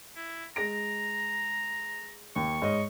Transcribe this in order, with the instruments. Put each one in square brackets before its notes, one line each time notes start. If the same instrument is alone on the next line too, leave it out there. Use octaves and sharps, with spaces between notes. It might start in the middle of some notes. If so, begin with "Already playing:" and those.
[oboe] E4
[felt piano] G#3 A#6 D7 [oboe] A#5
[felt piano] D#2 [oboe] C#6
[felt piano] G#2 C#5 D#5